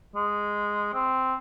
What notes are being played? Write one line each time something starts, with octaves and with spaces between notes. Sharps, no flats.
G#3
C4